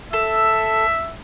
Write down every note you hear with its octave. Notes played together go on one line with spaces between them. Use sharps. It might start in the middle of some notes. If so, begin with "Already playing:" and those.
A4 E5